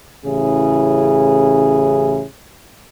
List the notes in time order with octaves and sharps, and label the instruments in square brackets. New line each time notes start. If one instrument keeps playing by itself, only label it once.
[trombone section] A1 C#3 E4 G#4